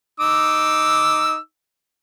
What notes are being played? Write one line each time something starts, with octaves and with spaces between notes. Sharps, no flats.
D#4 D6 E6